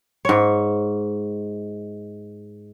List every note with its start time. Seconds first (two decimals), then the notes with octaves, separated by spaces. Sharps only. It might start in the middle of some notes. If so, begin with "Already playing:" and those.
0.25 G#2 C#5